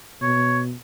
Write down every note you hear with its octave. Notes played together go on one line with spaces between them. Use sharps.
B2 C#5